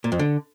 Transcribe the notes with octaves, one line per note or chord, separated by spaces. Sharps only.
A#2
F2
D3